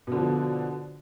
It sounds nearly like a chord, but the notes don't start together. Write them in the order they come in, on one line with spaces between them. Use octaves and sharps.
B2 D3 F3